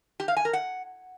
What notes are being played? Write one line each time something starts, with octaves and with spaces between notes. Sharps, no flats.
G4
F5
G#5
A#4
F#5